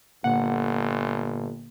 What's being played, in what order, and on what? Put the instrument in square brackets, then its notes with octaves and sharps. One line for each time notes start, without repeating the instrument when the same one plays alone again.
[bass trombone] G1 [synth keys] A#2 D3 A#3 [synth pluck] F#5